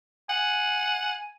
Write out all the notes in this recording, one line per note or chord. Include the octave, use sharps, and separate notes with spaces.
F#5 G#5